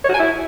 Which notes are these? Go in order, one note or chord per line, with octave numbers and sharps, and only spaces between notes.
C#5
F#4
G#5
E4